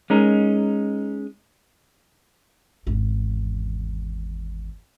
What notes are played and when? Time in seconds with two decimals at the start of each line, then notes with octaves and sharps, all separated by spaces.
0.10 G#3 C#4 D#4 A#4
2.87 G#1 E2